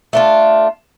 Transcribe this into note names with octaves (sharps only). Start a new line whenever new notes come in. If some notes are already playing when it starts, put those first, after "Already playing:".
A3 D4 F4